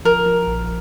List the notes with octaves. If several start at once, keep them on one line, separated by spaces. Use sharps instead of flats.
F3 A#4
F3
A#1